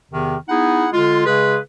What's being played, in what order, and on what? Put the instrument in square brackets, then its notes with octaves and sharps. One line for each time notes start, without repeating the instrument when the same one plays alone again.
[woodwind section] E2 C3 D#3
B3 D#4 E4 G#4 F#5
D3 G#3 F4
C#3 G#3 G#4 B4